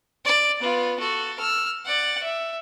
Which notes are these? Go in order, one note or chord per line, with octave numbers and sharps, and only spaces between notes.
D5
B3 F4
F#4 A4
E6 F6
D5 F#5
E5